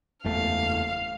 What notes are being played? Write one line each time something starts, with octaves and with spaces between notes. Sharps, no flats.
F#1 E2 A3 F5